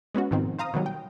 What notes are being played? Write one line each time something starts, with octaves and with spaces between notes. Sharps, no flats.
G#3 B3 C#4 F#4
G#2 B2 D#3 F3 C4
C5 F5 A#5 D#6
B2 D#3 F#3 G3
G5